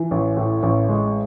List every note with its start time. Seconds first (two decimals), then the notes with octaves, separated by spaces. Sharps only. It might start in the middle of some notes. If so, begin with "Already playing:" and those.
Already playing: E3
0.11 A1
0.37 A2
0.63 A1
0.89 G#3